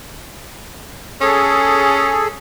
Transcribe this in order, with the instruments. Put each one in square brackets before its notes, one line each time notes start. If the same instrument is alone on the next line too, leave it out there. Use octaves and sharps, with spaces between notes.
[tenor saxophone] C#4 [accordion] G#4 A4